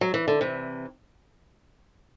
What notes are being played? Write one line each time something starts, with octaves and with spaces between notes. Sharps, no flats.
F#3
E3
D3
C3 E3